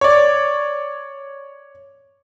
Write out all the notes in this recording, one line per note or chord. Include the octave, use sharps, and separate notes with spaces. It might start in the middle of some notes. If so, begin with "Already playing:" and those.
C#5 D5